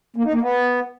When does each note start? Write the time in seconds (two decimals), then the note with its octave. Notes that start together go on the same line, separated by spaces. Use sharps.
0.16 A#3
0.25 D#4
0.33 A#3
0.42 B3